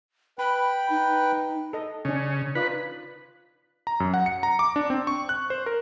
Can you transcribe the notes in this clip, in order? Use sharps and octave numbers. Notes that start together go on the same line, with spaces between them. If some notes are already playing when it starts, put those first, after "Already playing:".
B4 G5 B5
D#4
A4 D#5
C#3 C#4 D4
D#4 F4 B4 D5
A#5
F#2
F#5
C#7
A#5
D6
D4
C4
C#6
F#6
C5
A#4